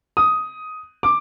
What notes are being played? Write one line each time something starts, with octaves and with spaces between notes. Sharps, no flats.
D#6
D6